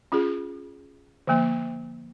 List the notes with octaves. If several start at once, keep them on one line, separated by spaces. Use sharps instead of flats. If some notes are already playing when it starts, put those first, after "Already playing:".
C#4 F4 G#4
D3 F3 A#3